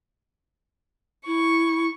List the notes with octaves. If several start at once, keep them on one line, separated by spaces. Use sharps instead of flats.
E4 C#6